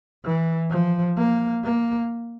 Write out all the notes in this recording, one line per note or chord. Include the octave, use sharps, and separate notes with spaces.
E3
F3
A#3
A#3